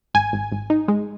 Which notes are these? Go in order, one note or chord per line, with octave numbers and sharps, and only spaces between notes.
G#1 G#5
G#1
G#1
D#4
G#3